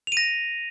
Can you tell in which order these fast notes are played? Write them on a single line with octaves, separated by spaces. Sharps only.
F7 D#7 A#6